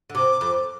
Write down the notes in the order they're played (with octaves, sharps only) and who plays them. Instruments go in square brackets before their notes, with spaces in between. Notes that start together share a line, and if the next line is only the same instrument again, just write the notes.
[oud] D3
[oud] C3 [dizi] D6
[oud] F2